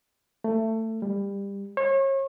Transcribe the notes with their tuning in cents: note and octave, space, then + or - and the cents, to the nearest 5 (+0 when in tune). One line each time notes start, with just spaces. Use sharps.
A3 +20
G3 +25
C#5 -35